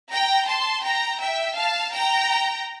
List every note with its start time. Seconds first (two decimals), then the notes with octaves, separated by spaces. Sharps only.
0.12 G5 A#5
0.48 A5 C6
0.84 G5 A#5
1.20 E5 G5
1.56 F5 A5
1.93 G5 A#5